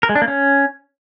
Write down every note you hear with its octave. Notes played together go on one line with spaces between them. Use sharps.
A#4
G#3
D4
A#3
C#4